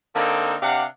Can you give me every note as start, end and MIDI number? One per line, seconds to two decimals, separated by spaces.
0.15 0.56 50
0.15 0.56 58
0.15 0.56 60
0.15 0.56 63
0.15 0.56 69
0.62 0.84 48
0.62 0.84 62
0.62 0.84 77
0.62 0.84 78